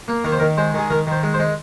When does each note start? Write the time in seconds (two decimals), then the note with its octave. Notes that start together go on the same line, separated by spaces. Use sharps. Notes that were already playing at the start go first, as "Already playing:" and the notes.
0.08 A#3
0.24 D#3 A#4
0.32 C5
0.39 D#3 A#4
0.57 G#3 C5
0.74 D#3 G#4
0.90 D#3 A#4
1.07 D#3 C5
1.23 G#3
1.34 C5
1.39 G#3